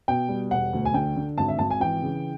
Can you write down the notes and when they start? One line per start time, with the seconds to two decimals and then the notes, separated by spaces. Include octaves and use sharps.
0.08 B2 G5
0.29 G3
0.51 E1 F#5
0.73 D2
0.85 G#5
0.94 D3 G5
1.16 D3
1.38 G#1 A5
1.48 E5
1.59 G#1 A5
1.71 G#5
1.80 E3 G5
2.02 C#3